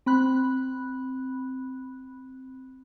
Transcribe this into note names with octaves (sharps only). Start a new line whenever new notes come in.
C4 B5 F#6